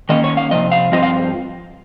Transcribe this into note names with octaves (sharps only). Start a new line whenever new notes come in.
D#3 A#3 C#4 D#5
C#5
F5
C3 F3 D#5
F5
G2 F3 C4 F4 D#5
F5